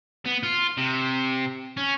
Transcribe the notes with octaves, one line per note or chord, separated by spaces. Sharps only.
B3
F4
C3
C#4